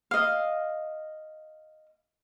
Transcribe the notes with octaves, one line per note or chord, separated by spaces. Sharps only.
D#5 F5